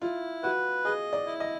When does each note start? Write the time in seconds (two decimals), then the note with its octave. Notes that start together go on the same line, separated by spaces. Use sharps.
0.02 E4 F4
0.43 F#4 B4
0.85 G#4 D#5
1.13 D5
1.27 E4
1.40 D#5